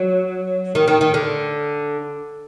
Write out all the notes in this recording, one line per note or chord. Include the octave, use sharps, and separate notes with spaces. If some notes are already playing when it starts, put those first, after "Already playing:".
Already playing: F#3
D#3
D#3
D#3
D3